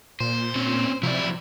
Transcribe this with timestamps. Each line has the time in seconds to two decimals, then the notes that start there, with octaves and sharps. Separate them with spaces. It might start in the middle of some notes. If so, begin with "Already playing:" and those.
0.20 A#2 C5
0.56 C4 C#4
1.03 C3 F3 F#3 E4 D5